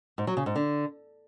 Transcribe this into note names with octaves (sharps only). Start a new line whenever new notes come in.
G#2
F#3
C#3
G#2
D3